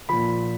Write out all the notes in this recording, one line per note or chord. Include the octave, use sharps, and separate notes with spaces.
A#2 F3 B5